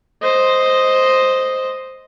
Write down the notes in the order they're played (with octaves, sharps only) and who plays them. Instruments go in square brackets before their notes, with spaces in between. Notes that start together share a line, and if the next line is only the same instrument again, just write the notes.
[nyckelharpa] C5 D#5